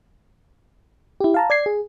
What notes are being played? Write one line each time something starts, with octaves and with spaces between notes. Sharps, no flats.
E4 G4
F5 A5 A#5
D5 G#6 C7
G#4